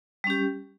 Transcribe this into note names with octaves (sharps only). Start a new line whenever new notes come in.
G3 C#4 G4